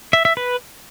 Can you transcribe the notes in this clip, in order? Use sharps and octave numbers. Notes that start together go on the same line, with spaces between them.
E5
E5
B4